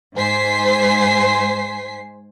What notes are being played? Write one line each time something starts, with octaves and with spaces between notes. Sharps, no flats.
G#2 C5 G#5 B6 C7